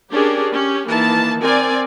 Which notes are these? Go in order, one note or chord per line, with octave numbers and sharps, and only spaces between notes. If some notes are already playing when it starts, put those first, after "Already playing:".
C#4 D4 G4 G#4 A#4
C#4 G4
D#3 E3 A#3 A5
C4 A#4 D5 G#5